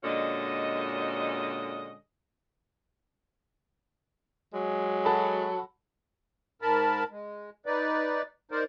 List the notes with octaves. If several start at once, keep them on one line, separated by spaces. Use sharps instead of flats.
A#2 D3 G#3 C#4 F#4 D#5
F#3 G#3
F#4 A4 B5
G#2 A#4 A5 B5
G#3
D#4 B4 D5
D#4 A#4 C5 D5